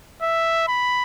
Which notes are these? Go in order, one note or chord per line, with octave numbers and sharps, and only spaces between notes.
E5
B5